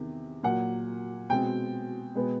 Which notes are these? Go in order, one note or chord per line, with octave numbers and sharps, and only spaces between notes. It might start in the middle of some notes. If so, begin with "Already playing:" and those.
Already playing: E2 C3 D#3
A#2 F#3 A#3 F#5
B2 G#3 C4 G5
B2 G#3 B3